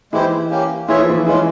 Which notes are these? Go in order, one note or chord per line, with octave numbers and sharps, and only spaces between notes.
E3 G#3 E4 G4 C5
A#3 C#4 G4
E3 F4 G#4 C#5 E5
F3
E3
E3 G#3 C#4 F4